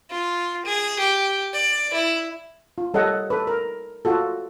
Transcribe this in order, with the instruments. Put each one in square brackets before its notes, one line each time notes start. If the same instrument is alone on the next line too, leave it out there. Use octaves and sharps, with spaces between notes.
[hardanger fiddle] F4
G#4
G4
D5
E4
[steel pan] F4
G3 A4 A#4 C#5 D#5 F#5
A4 B4
A#4
F4 F#4 A4